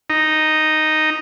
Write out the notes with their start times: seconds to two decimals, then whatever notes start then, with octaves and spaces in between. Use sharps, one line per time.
0.10 D#4